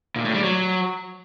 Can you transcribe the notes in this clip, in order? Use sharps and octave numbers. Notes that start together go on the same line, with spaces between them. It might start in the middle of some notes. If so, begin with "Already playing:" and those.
A#2
A2
G3
F#3